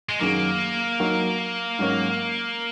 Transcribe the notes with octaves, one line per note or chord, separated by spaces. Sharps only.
G#3
F#2 D#3 F#3 A#3 C#4 G#4
F#3 D#4 F#4 A#4
G#2 F#3 C#4 A#4